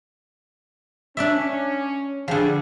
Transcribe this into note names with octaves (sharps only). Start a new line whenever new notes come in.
C#4 D4 D5 E5
D3 F3 G3 G#4